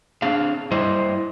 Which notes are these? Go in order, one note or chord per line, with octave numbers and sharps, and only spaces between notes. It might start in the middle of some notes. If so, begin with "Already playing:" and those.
C4 D4 G#4 F5
G3 E4 C5 D#5